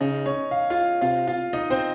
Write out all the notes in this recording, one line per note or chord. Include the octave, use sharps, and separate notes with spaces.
C#3 D#4 D#5
C#4 C#5
F5
F4 F5
C3 F4 F5
F4 F5
D#4 D#5
C4 C5